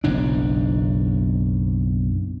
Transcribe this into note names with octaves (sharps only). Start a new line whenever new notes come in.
F#1 B1 G#2 D4